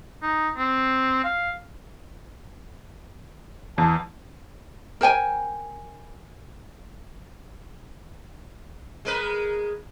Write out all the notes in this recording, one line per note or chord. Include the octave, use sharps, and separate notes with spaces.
D#4
C4
F5
E2 A5
A#4 C5 G5 G#5
G#3 A#4 B4